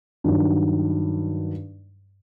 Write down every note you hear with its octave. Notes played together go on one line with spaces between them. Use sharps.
G2 D#3 F#3